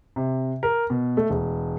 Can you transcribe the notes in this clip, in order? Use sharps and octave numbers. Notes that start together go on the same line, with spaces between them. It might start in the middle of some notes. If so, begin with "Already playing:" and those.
C3
A#4
B2
A3
E1